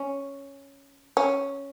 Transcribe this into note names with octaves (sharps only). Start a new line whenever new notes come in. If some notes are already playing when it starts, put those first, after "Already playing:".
Already playing: C#4
C#4